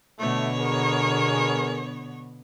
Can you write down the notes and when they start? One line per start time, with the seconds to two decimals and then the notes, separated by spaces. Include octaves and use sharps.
0.20 B2 D3 A3 B3 C#5
0.59 G#4 A#4